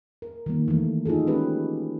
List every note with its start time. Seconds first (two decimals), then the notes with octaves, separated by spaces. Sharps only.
0.22 A#4
0.46 D#3 G3 A#3
0.68 E3 G3 A3
1.05 D#4 F4 F#4 G#4 A4
1.27 G#3 C#4 F#4 G4 A4 B4